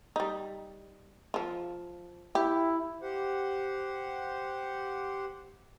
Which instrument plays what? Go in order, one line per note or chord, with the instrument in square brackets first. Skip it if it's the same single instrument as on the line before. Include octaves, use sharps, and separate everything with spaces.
[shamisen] G3 D#4
F3 F4
[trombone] E4 [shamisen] G4
[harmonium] G4 C5 F#5